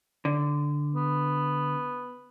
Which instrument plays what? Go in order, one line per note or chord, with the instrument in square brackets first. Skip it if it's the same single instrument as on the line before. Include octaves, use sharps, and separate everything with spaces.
[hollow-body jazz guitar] D3
[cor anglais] B3